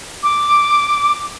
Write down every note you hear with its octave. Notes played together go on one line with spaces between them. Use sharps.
D6